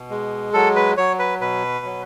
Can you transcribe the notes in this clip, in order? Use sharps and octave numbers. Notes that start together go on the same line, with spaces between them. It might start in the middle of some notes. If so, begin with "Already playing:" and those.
Already playing: B2
G#3
F#3 A4
B4
F#3 C#5
B4
B2 B4
F#3